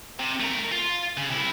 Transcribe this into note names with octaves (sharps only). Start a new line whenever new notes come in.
C3
A3 A#4
F4
C#3
C3 E4